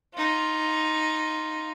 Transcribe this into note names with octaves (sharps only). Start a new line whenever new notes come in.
D#4 F4